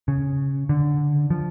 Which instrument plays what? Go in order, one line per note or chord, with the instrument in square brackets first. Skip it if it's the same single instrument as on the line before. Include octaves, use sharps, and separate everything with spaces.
[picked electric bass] C#3
D3
F3